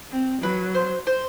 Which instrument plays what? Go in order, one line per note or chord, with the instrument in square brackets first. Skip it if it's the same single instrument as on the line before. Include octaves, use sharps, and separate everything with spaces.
[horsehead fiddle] C4
[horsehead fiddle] F#3 [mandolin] B4
[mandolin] C5
C5